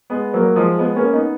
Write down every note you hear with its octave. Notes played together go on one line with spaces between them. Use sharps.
G#3 B3
F#3 A#3
F3 G#3
G#3 B3
A#3 C#4
B3 D#4